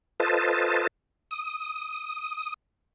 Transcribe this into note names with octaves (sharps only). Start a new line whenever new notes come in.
F4 A4 B4 C5 D#5 A5
D#6